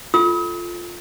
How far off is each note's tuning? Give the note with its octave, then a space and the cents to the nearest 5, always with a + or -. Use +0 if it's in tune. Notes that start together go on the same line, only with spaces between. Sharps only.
F4 +0 A4 +0 D#6 +45